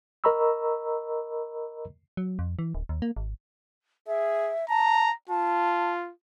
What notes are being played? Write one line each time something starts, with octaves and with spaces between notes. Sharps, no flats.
A#4 D#5 A#5 B5 C#6 E6
F#3
F2
E3
D1
D#2
A#3
G#1
G#4 E5
A5 A#5
F4 A5